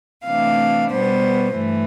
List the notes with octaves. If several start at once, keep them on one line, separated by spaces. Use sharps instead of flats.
C3 E3 A3 D4 F5
B2 G3 B3 C5
G2 E3 A3